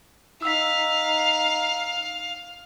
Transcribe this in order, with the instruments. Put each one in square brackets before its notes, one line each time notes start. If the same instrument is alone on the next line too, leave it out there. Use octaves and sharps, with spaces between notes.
[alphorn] D#4 [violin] F5 [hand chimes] E6 B6